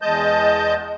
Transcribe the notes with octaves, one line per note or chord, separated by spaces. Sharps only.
E2 G#3 D#5 A5 G6